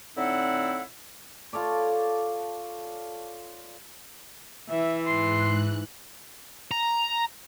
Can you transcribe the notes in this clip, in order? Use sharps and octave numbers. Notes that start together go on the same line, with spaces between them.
A2 D3 C4 D#4 E4 F#5
F4 A4 C#5 D5
E3 E5
G#2 C6 F#6
A#5